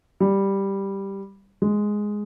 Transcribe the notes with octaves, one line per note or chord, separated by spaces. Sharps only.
G3
G#3